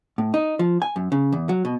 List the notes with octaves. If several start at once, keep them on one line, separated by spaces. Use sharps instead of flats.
A2
D#4
F3
G#5
F#2
C#3
E2
F#3
B2